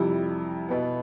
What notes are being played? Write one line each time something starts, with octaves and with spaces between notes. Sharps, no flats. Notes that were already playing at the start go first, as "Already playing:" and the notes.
Already playing: F2 C3 G3 E4
B2 B3